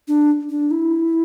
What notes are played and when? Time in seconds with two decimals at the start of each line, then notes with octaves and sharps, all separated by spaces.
0.08 D4
0.49 D4
0.71 E4